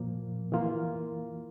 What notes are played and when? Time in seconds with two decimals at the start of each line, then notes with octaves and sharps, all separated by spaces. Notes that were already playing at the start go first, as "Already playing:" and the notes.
Already playing: A#2 F3 A#3
0.52 E3 A#3 F4